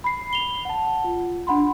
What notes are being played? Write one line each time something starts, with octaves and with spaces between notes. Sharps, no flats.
B5 C7
F7 G7
F#5 A5
F4
D4 F#5 B5 C6